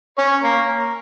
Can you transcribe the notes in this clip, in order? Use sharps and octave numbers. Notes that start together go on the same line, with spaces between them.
C#4 C#5
A#3 A#4